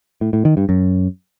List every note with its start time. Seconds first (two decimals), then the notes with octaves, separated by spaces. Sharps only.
0.21 A2
0.33 A2
0.45 D#3
0.57 G2
0.69 F#2